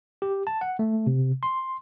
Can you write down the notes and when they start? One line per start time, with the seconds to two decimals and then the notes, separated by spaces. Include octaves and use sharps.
0.22 G4
0.47 A5
0.61 F#5
0.79 A3
1.07 C3
1.43 C6